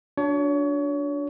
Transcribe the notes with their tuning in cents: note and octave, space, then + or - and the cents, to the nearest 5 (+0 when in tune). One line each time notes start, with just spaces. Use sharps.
D4 -15 F#4 -35 C#5 +30